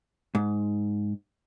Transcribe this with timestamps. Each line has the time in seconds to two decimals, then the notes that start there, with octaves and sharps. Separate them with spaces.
0.35 G#2